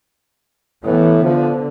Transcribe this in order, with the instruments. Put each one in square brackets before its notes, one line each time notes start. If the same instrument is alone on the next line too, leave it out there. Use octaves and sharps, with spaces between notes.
[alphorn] A2 [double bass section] E3 B3
[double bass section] D3 [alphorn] F3